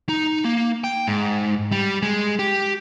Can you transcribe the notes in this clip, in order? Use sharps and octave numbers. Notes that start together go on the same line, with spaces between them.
D#4
A#3
G5
G#2
G3
G#3
G4